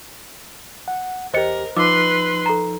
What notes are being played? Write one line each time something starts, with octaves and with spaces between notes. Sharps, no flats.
F#5
E2 G4 A#4 C5 D#5 C#7
F3 D#4 B4 C6 D6 E6
A4 A#5